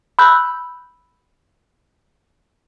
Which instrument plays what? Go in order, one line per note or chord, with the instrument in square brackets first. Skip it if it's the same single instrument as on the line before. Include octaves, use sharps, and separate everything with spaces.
[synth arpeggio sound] B5 E6 F#6 G6